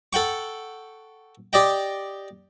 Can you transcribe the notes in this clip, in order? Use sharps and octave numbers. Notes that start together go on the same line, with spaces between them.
A4 F#5 G5 C#6
G4 D5 D#5 G5